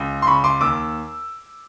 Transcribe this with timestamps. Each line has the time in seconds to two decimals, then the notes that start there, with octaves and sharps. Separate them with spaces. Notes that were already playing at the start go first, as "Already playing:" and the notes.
Already playing: C#2
0.22 C6
0.27 C#3 B5 C#6
0.44 C6 D6
0.61 D#2 D6 E6